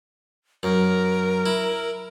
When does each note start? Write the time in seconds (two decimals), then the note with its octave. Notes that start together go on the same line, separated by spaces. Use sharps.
0.63 F#2 A#4
1.46 E4